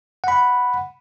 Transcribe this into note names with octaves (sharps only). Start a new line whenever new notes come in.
F#5 B5